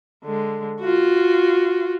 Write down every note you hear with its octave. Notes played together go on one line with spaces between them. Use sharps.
D3 G#3
F4 F#4